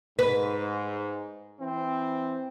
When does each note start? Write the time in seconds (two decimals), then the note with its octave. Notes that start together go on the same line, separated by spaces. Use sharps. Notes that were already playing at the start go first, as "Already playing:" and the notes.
0.19 G#2 B4
1.61 E3 C4